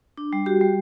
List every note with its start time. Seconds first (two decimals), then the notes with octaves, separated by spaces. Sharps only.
0.18 D4
0.33 G3
0.46 F#4 G4
0.61 G3